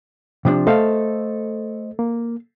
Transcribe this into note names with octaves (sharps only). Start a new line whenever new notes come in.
C3 F3 D4
A3 A4 C5 D#5 F5
A#3